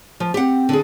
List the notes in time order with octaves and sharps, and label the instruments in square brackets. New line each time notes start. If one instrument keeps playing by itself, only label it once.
[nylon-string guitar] F3
[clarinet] C4 [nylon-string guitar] G4 F#5
[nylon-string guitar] D3 G#4